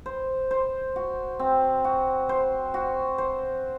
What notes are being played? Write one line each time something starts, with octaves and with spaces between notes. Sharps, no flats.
C5
C5
F#4
C4
F#4
C5
F#4
C5